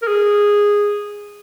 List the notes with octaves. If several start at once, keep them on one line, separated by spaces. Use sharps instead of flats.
A#4
G#4